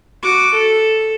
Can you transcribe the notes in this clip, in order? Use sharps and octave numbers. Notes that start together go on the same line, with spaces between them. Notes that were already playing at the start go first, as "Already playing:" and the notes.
F#4 D6
A4